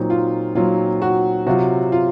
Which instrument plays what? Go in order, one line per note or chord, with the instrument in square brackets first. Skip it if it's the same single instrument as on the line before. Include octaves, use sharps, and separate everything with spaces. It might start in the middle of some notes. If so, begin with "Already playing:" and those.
Already playing: [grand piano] A#2 F#3 C4 D#4
[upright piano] F4
[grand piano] A#2 F#3 C4 D#4 [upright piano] F4
[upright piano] F#4
[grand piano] C3 F#3 C4 F4 [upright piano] F#4
[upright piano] F4